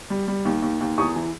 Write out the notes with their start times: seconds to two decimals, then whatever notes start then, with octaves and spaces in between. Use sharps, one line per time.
0.10 G3
0.28 G3
0.45 D#2
0.62 D#2
0.81 D#2
0.98 E2 C#6 D#6
1.16 E3